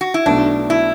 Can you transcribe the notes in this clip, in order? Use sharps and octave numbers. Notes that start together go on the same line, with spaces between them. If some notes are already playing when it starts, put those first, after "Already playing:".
F#4
E4
B1 B2 A3 D4
E4